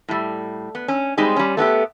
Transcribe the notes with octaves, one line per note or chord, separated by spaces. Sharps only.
A2 G3
B3
C#4
G3 G#3 C4 D#4 G4
G3 C#4
A3 B3 F#4 G4